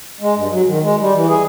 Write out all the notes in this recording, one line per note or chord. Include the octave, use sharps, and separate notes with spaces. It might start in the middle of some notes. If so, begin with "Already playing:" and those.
G#3
G2
F#3
D#3
G#3
G3
E3
G#4